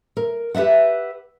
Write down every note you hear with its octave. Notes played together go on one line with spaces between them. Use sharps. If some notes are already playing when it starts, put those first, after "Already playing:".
A#4
G4 B4 D#5 E5 F#5